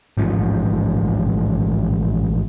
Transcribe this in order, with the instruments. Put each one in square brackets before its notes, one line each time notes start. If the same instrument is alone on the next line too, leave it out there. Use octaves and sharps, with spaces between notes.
[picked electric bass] A1 G#2 F3